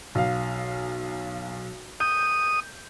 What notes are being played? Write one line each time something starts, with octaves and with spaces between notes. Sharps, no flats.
B1 F5
D#6 G6